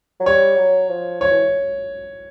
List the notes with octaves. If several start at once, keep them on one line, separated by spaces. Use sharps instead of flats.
F#3
G3 C#5
F#3
F3
F3 C#5
E3